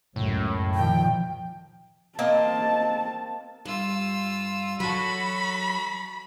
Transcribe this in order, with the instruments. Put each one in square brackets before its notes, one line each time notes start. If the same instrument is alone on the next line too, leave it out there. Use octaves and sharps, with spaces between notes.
[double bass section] C#2 F#2 [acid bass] A2
[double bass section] A#2 D#3 F3 [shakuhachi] G5
[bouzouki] A#3 C4 D#5 [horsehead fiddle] A5
[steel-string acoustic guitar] G2 [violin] F4 E6
[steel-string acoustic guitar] F#3 [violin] F#4 A4 [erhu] B5